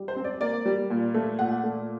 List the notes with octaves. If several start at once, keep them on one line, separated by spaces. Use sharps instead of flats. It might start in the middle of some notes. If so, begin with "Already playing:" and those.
Already playing: G3
C5
C4
D5
A#3 D5
G3
A#2
A3
A#2 F#5
A3